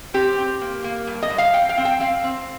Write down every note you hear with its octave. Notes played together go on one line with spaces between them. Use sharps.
C4 G4
C4
A#3
A#3
G2
D#5
G2
F5
F2 G5
F5
C4
G5
C4 F5
C4